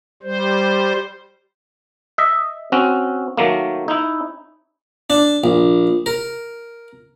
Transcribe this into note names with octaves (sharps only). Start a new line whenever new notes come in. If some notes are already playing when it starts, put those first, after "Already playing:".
G3 C5
D#5 E5
C4 C#4 F#4
D#3 F#3 A3 A#3
D#4 E4
D4
A#1
A#4